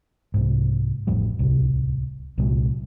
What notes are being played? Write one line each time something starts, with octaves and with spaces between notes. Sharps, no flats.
C2 G#2
A1 F2 A2 G3
D1 C2
C2 A#2 F#3 G#3